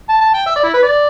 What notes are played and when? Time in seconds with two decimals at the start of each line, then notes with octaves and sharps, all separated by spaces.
0.09 A5
0.21 A5
0.34 G5
0.46 E5
0.56 D5
0.64 E4
0.74 B4
0.83 D5